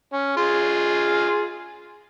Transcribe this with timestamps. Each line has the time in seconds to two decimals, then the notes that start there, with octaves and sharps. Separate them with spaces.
0.12 C#4
0.37 F4 G#4